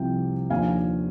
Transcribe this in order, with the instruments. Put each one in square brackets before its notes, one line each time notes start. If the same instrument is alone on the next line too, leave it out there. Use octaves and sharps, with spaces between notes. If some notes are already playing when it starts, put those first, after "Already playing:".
Already playing: [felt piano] C2 C3 F3 G5
D#2 D3 F3 F5 G#5